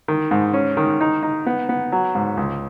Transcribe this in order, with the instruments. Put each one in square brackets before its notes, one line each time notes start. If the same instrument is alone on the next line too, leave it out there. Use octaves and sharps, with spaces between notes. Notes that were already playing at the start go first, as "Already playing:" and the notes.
[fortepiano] D#3
G#2
C#4
D#3
D#4
D#4
B3
B3
F#3
G#2
C#2